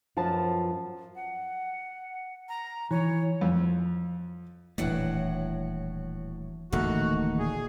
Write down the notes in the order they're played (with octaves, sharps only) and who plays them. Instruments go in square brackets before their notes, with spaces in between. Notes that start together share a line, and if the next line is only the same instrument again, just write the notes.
[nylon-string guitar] F#2 F3 B4 A5
[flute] F#5
A#5
[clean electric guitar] E3 [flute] C#5
[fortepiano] F2
[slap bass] D#1 A3 [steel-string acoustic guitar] A2 F#3 F#4 [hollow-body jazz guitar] E3 D4
[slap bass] D1 A1 A#3 [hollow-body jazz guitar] D#3 A3 [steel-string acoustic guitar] D#4 [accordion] F#4
[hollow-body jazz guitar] A#2 [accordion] G#4